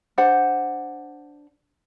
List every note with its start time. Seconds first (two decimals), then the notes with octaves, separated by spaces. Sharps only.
0.18 D4 C5 F#5